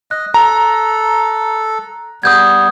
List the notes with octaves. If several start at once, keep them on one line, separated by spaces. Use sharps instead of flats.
D#5 F#6
A4 A#5
G3 B3 D#6 G6 G#6